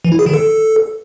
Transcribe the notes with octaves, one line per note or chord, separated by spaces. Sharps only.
E3
E4
G#4
D#3
A4